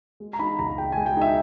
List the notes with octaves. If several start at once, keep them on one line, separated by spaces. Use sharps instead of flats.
G#3
A#5
D#4 B5
C#2 A#5
G#3 G5
G#3 G#5
G5
D#4 E5